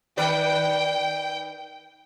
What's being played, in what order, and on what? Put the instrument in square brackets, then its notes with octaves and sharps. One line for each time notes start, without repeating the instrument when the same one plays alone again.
[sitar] D#3 B4 D5 [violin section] G5